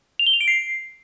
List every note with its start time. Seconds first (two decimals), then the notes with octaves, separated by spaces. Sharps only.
0.19 F7
0.26 G7
0.34 F7
0.41 D7
0.48 C7